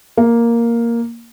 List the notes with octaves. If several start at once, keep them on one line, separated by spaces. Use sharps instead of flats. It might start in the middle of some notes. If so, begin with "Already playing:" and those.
A#3